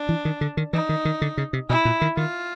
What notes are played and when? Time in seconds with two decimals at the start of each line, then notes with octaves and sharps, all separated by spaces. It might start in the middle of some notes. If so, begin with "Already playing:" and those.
Already playing: D4
0.09 E3
0.25 D#3
0.41 D3
0.57 D#3
0.73 E3 D#4
0.89 D#3
1.05 D#3
1.22 D3
1.37 C#3
1.53 C3
1.69 B2 E4
1.85 A#2
2.01 D#3
2.17 D#3 F4